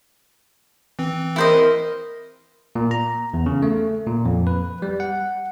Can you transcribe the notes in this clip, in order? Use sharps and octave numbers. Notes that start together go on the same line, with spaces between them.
E3 C4
E4 A#4 C5 D#5
A#2
A#5
E2
C#3
A3
A#2
F2
B4
G3
F#5